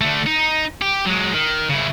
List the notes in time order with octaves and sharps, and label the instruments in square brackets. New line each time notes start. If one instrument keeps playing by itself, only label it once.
[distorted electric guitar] D3 A3
D#4
G4
F#3 G#3
D#3
C#3 E4